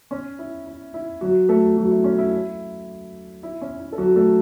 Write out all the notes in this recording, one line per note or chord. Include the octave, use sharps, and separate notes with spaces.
C#4
E4
E4
E4
F#3 F#4
A3 A4
F#3 F#4
E4
C#4
E4
E4
C#4
E4
A4
F#3 F#4
A3 A4